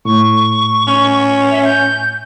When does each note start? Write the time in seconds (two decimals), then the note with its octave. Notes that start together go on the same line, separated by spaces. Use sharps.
0.05 A2 C#6
0.88 C#4
1.51 E5
1.65 G6